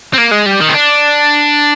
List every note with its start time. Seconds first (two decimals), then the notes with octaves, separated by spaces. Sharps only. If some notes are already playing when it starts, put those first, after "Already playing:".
0.14 C4
0.18 A#3
0.31 G#3
0.46 G3
0.60 D#3
0.68 C4
0.74 D4